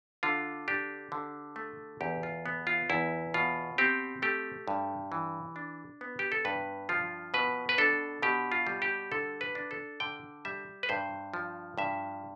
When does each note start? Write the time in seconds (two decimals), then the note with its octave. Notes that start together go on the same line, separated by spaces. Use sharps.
0.23 D3 F4
0.68 D4 G4
1.12 D3
1.56 A3
2.01 E2 G4
2.23 F4
2.46 B3
2.67 F4
2.90 E2 E4
3.34 B2 F4
3.78 C4 G4
4.22 A3 G4
4.68 G2
5.12 E3
5.56 D4
6.01 B3
6.19 G4
6.32 A4
6.45 G2 B4
6.89 F3 F4
7.34 B2 B4
7.69 B4
7.78 D4 A4
8.22 B2 G4
8.52 F4
8.67 G3
8.82 G4
9.12 D3 A4
9.41 B4
9.55 D4
9.71 A4
10.00 D3 G5
10.45 G3 E5
10.83 B4
10.89 G2 C5
11.34 F3
11.78 G2 E5